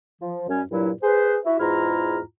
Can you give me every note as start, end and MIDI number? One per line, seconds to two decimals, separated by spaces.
0.21 0.48 53
0.48 0.62 42
0.48 0.62 55
0.48 0.62 61
0.70 0.90 43
0.70 0.90 46
0.70 0.90 54
0.70 0.90 64
1.02 1.38 68
1.02 1.38 71
1.02 1.38 72
1.45 1.59 64
1.45 1.59 66
1.45 1.59 76
1.59 2.20 40
1.59 2.20 44
1.59 2.20 64
1.59 2.20 65
1.59 2.20 82
1.59 2.20 89